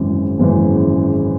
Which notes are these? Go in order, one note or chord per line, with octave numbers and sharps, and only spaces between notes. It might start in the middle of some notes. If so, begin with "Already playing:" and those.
Already playing: G#1 F#2 C#3 E3
G#1 F#2 C#3 E3